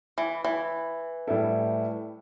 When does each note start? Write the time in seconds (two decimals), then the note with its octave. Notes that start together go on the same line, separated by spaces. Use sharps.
0.18 E3
0.44 E3
1.27 A2 G3 E4 A4